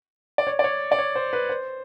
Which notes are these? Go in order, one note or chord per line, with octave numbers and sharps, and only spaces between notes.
D5
C#5
D5
C#5
D5
C#5
C5
B4
C5